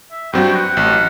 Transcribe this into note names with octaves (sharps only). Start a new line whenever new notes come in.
E5
G2 F#3 C4 F#4 G5
G5
F#5
A1